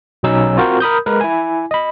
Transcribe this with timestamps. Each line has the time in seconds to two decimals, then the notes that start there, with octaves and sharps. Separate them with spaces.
0.23 B1 B2 F#3 C#4 D#4 E6
0.57 C4 F4 F#4 A#4 C5
0.80 A#4 B5 D#6 G6
1.06 G#3 A#4 B4
1.21 E4 G#5
1.71 D#5 B5